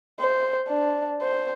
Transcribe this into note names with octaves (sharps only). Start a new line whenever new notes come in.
C5
D4
C5